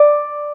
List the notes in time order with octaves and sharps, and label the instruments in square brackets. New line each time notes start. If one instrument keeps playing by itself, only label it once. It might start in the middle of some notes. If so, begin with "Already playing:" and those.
Already playing: [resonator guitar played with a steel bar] D5